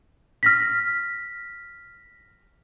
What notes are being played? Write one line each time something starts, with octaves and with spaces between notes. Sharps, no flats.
F6 A#6 B6